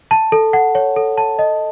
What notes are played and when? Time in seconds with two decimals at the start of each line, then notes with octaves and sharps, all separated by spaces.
0.11 A5
0.32 A4
0.53 F#5
0.75 C#5
0.96 A4
1.18 A5
1.39 D#5